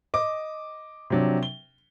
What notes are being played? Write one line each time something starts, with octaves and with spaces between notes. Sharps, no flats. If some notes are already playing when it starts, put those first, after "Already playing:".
D#5 D6
C3 F3 F#3 D4
G7